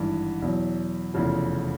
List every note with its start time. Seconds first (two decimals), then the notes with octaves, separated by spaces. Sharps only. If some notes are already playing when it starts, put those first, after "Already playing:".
Already playing: G#1 G2 E3
0.42 E2 B2 F#3
1.14 F1 E2 C#3 F3